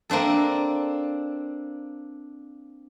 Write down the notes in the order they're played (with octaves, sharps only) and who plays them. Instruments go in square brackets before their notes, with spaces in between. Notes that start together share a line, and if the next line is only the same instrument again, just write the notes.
[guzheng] A#3 C4 D4 A4